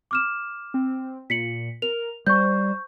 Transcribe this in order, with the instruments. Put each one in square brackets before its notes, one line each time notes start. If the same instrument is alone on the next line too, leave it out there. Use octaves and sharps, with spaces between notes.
[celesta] D6 F6 E7
[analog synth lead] C4
[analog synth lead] A#2 [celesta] B6 C#7 F#7
[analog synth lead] A#4 [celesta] F7
[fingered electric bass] G3 [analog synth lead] C5 [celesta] C#6 G6